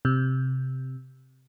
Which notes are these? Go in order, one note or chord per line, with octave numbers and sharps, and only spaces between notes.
C3